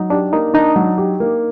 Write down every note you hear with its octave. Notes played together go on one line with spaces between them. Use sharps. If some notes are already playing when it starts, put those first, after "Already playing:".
Already playing: F#3 D#4
D4 G4
A#3 D#4
D4 D#4
F#3
G4
A#3